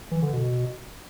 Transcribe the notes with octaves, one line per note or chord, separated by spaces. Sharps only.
E3
D3
B2